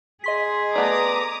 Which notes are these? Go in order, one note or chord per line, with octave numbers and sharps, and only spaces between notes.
G#4 D#5 C6 B6
A3 B3 D5 A#5 D6 D#6